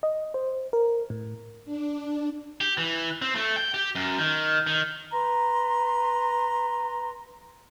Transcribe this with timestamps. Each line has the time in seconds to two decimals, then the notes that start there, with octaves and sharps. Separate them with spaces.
0.03 D#5
0.34 C5
0.73 A#4
1.10 A2
1.65 D4
2.61 G4
2.78 E3
3.22 C4
3.35 A3
3.56 G5
3.74 G4
3.95 F#2
4.19 D#3
4.67 D#3
5.12 B4 A#5 C6